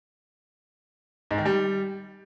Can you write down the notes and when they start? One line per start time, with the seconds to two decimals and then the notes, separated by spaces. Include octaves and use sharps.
1.31 G#2
1.38 D#3
1.45 G3